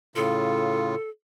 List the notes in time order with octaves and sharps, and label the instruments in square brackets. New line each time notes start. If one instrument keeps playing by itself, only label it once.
[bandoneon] A2 C#3 F4 [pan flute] A4